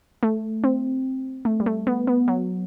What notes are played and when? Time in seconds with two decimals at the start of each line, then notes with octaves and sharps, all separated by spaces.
0.23 A3
0.64 C4
1.45 A3
1.60 G3
1.66 A3
1.87 B3
2.07 B3
2.28 F#3